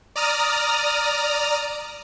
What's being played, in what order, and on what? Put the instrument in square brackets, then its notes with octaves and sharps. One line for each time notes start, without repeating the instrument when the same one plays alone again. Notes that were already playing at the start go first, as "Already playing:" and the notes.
[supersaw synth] D5 A#5 D#6 F6